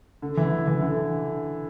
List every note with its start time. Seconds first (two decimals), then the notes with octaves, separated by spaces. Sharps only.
0.22 D3
0.37 E3
0.67 E3
0.81 D3